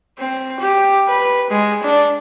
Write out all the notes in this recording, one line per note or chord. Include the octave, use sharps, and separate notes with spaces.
C4
G4
B4
G#3
D4